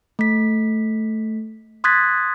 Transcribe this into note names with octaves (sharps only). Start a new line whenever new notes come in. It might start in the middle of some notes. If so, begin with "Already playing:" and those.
A3 B6
C6 D#6 F#6 G#6 A6 B6